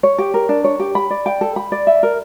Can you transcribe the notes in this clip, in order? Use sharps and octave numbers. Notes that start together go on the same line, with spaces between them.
C#5
G4
A#4
D4
C#5
G4
B5
D5
G5
A4
B5
D5
E5
A#4